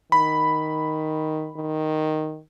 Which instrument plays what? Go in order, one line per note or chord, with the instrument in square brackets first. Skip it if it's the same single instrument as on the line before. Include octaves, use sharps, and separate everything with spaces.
[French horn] D#3 [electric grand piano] B5
[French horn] D#3